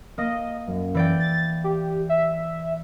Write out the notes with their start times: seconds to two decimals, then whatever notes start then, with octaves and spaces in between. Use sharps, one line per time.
0.18 A#3 D#5
0.67 F#2
0.95 E3 D5 G5
1.20 A6
1.64 G4
2.09 E5